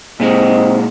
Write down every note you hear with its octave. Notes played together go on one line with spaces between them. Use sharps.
A#2 G#3 C4 D#4